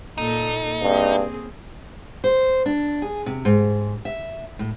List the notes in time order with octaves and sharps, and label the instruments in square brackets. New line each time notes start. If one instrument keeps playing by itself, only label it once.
[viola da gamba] A#2 A#3 A4 [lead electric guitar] D#4
[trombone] G2 [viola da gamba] A#3 C4 G#4
[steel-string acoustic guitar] C5
D4
G#4
C3
G#2
E5
A2